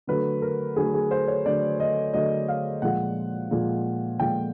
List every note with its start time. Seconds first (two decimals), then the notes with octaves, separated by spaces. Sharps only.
0.07 D3 F#3 A3 B4
0.42 A#4
0.76 D3 F#3 A3 G#4
0.94 G#4
1.11 C5
1.28 C#5
1.46 D3 F#3 A3 D5
1.80 D#5
2.13 D3 F#3 A3 D#5
2.48 F5
2.82 A#2 F3 G#3 F#5
3.51 A#2 F3 G#3
4.19 A#2 F3 G#3 G5